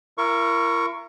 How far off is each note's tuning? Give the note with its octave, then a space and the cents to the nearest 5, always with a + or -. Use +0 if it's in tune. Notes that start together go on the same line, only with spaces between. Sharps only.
E4 +45 A#4 +0 C#6 +0